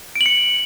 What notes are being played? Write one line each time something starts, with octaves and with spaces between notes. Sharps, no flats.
D7
F#7
C#7